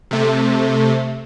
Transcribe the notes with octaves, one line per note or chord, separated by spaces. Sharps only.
C3 A3